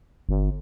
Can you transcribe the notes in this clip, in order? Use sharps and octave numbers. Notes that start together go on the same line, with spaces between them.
G1